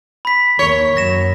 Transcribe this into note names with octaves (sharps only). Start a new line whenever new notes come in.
B5 B6
D#2 D#3 C#5 C#6
F#2 A#6 E7